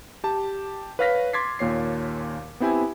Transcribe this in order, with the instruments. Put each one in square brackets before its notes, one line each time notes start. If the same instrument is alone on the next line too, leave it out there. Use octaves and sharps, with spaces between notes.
[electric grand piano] G4 A5
B4 C#5 F5 F6 A#6 B6
C6 D6 G#6 A6 B6 C7
D#2 A#2 C#5 C7
B3 C4 E4 G4 G#5